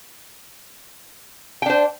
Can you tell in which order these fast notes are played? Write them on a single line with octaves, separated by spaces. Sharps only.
G5 D4 C5